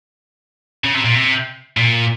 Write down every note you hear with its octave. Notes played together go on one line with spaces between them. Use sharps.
C#3
C3
A#2
C3
A#2